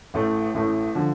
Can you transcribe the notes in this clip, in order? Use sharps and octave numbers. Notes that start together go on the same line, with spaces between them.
A1 A2 A3
A1 A2 A3
D3 F3